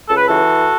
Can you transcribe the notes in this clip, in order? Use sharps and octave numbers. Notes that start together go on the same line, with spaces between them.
C#2 A4
B4
E3 F#4 A4